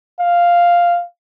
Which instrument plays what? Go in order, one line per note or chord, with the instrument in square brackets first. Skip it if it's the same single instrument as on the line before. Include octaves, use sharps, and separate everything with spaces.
[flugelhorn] F5